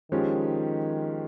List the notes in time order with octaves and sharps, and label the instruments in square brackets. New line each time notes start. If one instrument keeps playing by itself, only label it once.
[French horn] D#3 [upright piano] F3 G#3 C#4 G4